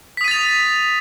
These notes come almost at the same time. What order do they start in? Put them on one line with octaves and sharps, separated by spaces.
B6 D#6 D#7 A6 F7